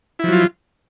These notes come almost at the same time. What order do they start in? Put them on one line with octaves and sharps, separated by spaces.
E4 F3 F#3 F4